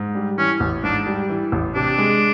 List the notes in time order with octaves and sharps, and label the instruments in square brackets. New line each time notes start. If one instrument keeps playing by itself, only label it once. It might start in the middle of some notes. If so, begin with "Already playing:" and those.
Already playing: [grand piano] G#2
G3
[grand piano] E3 [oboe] C#4
[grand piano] A1
[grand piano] G#2 [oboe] D4
[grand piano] G3
E3
A1
[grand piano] C3 [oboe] D4
[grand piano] G#3